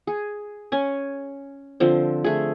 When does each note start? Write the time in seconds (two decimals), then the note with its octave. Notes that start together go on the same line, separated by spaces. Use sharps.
0.07 G#4
0.72 C#4 C#5 G#5
1.80 D3 F3 C4
2.24 A3 G#4